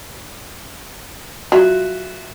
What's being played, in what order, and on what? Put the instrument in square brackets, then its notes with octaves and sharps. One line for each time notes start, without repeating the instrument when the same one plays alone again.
[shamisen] F#3 [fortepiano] F4 F#4 E5